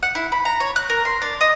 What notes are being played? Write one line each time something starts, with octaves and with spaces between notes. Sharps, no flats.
F#5
E4
B5
A#5
C#5
F#6
A#4
C6
D4
D#5